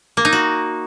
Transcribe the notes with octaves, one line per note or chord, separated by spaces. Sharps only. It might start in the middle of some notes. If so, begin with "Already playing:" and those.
A#3
D#4
F#4